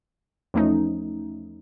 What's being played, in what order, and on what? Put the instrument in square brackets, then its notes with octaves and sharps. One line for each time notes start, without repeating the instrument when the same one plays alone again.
[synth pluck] E2 F3 A3 C#4 D#4